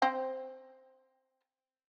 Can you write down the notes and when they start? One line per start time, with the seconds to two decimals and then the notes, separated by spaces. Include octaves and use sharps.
0.02 C4 C5 G5